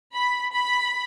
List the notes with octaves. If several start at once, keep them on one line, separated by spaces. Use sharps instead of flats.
B5
B5